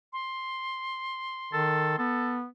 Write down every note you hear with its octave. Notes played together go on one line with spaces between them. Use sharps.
C6
D#3 A4
B3 A4